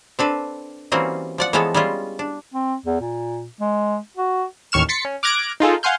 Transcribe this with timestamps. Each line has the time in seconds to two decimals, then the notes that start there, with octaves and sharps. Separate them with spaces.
0.19 C4 D4 A4 B4
0.92 E3 G3 A#3 C4 C#4 F#4
1.38 F3 D5 F#5
1.53 E3 F3 G#3 B3 A4 C#5
1.74 G3 G#3 C#4 E4 F4
2.19 D4
2.53 C4
2.86 E2
3.01 A#2
3.61 G#3
4.17 F#4
4.72 A1 D#2 C#6 F6 E7
4.89 C6 A6 B6 C#7
5.05 C#4
5.23 D6 F6 F#6 G#6 A#6 D7
5.60 D#4 F4 G#4 A4
5.83 F5 F#5 G#5 C6 F6 G6